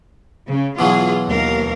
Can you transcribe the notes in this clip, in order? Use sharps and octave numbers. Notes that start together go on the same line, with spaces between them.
C#3
B2 E3 F#3 F4 G#4
D#2 A#4 F5